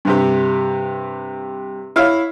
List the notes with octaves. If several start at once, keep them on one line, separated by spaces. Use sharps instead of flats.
G2 C3 G4
E4 C#5 F5